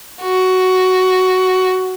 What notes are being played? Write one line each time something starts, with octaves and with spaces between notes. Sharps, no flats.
F#4